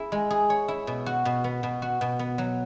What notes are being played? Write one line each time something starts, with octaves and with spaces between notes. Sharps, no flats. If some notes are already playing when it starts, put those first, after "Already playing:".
Already playing: E4 G#4
G#3
G#4
C#5
E4
B2
F#4
B2
B3
B2
F#4
B2
B3
F#3